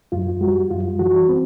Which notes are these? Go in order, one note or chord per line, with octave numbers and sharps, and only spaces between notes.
F#2 F4
G3 F#4
F#2 F4
E3 F#4
C4